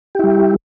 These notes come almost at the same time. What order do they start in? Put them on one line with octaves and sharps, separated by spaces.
G4 E4 G3